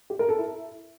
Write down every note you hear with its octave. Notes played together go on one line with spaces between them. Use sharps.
G4
A#4
A4
E4